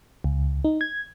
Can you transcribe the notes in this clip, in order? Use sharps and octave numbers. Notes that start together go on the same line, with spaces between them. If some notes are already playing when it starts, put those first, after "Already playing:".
C#2
D#4
G#6